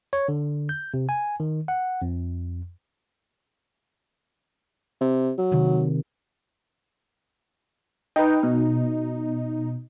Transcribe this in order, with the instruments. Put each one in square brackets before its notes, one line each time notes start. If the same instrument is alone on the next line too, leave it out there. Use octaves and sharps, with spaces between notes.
[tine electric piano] C#5
D3
G6
C3
G#5
D#3
F#5
F2
[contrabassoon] C3
F#3
[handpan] C3 D#3
[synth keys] D#4 [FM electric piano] B4 D#5 G5
[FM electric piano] B2